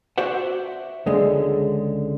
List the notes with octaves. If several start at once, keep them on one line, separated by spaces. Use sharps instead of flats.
F#4 C5 D5 E5 F#5
C#2 D3 G#3